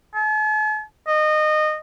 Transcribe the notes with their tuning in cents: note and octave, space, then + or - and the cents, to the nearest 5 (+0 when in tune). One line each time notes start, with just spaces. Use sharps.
A5 -45
D#5 -20